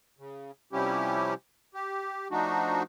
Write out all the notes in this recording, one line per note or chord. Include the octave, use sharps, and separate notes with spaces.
C#3
C3 F3 G3 C#4 E4 G4
G4
F3 A3 D4 D#4 F#4